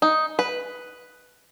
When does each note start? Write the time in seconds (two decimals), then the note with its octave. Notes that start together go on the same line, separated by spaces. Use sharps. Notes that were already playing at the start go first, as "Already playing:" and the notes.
0.02 D#4
0.39 B4